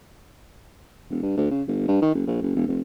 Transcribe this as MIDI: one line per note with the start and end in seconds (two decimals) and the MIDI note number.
1.11 1.20 28
1.23 1.37 43
1.37 1.46 38
1.51 1.62 49
1.68 1.83 31
1.88 1.98 43
2.02 2.14 51
2.15 2.25 30
2.27 2.37 34
2.42 2.52 30
2.56 2.66 28
2.67 2.81 29